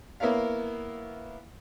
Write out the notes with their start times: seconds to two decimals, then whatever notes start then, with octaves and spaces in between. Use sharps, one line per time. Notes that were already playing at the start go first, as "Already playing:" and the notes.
0.20 A#3 B3 E4 A#4 C#5 F5